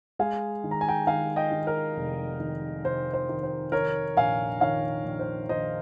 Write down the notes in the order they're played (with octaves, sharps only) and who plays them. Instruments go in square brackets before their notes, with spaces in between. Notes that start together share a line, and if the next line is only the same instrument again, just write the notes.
[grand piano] G#3 F5 G#5
D#3
A#5
G#5
G5 A#5
D#3 F5 G#5
D#5 G5
D#3
A#4
F1
D#3
F1 C5
C5
D#3
C5
D#3 A#4 C#5
A#1 F5 G#5
D#3 C#5 F5
A#1
C5
D#3 C5 D#5